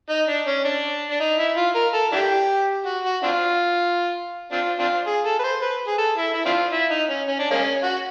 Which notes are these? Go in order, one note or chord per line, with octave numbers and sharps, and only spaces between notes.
D#4
D4
C#4
D4
D4
D#4
E4
F4
A#4
A4
D4 E4 G4
F#4
F#4
C4 D4 F4
C4 D4 F4
C4 D4 F4
G#4
A4
B4
C5
B4
G#4
A4
E4
E4
C4 D4 F4
E4
D#4
C#4
C#4
D4
G#3 A#3 C#4
F#4